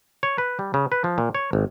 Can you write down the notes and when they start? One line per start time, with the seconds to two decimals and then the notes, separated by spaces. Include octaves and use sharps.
0.23 C#5
0.38 B4
0.59 G3
0.74 C#3
0.92 B4
1.04 F3
1.18 A#2
1.35 C#5
1.53 G#1